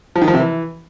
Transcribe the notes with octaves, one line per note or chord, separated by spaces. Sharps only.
F3
D#3
F3
C3
E3